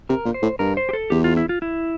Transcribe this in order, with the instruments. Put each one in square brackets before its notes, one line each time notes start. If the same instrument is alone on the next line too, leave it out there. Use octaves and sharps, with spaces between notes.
[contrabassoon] C3 [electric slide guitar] A#4
[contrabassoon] A#2
[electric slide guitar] C5
[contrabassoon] A2
[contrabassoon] G2 [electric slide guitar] A#4
[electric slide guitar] C5
G4
A4
[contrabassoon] E2 [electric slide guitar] G4
[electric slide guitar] F4
E4
F4
E4